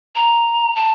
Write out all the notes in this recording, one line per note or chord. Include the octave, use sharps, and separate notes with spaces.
A#5
A5